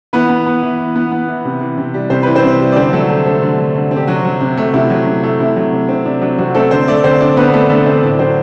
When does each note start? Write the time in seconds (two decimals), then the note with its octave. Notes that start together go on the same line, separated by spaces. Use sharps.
0.13 E3 B3 B4
0.29 B3
0.46 B3
0.63 E3
0.78 E3
0.96 B3
1.12 B3
1.28 E3
1.45 C3
1.61 E3
1.77 C3
1.94 G3
2.10 C3 C5
2.23 E3 B4
2.35 C4 C5
2.44 C3
2.60 G3
2.72 D5
2.76 D3 C4 C5
2.93 F#3 A3 A4
3.09 D3 A3 A4
3.26 A3 C4 A4
3.42 D3
3.59 F#3
3.75 D3
3.91 C4
3.97 G4
4.07 C3 F#3 F#4
4.25 F#3
4.41 C3
4.57 A3
4.74 C3 E4
4.90 F#3
5.07 C3
5.24 A3
5.39 C3 E4
5.56 F#3
5.72 C3
5.89 C4
6.05 C3 D4
6.21 F#3 D4
6.38 C3 F#3 F#4
6.55 A3 C4 A4
6.71 D3 C4 C5
6.87 A3 D4 D5
7.04 D3 C4 C5
7.20 C4 D4 D5
7.37 D3 B3 B4
7.48 B4
7.53 A3 A4
7.70 D3 A3 A4
7.86 C4 C5
8.03 A2 D4 D5
8.19 F#3 C4 C5